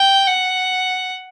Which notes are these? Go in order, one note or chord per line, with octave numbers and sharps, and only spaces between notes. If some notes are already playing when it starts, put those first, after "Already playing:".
Already playing: G5
F#5